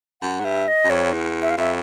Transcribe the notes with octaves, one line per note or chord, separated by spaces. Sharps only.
F#2 F#5
G#2
G2 E5
D#5
F#2
F2 C#5
E2
E5
F5
F2 E5